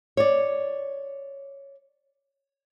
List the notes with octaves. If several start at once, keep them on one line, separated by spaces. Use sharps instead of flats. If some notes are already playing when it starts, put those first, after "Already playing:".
C#5 D5